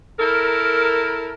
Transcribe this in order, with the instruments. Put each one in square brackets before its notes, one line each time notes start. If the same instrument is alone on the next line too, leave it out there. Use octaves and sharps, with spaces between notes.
[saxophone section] E4 A4 A#4